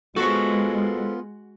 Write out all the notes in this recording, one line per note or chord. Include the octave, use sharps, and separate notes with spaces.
G#3 B3 F4 F#4 A4 A#4 C5